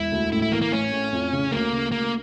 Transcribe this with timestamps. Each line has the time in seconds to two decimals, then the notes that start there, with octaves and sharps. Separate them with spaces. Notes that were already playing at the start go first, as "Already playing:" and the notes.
Already playing: E1 E4
0.12 D2
0.32 A2 E4
0.42 E4
0.52 E3 A#3
0.62 A#3
0.72 A1 C#4
0.92 A2
1.12 F2
1.32 C#3
1.52 D2 A#3
1.72 C#3
1.92 D2 A#3